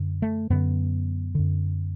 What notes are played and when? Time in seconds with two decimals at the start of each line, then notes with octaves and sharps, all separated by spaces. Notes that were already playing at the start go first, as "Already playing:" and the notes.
Already playing: F#2 D3
0.22 A3
0.50 F#2 D3 B3
1.35 F#2 D3